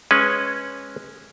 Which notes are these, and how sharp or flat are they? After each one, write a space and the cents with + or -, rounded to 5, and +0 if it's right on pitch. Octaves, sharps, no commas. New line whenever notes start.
G#3 +0 C#4 -10 B4 +0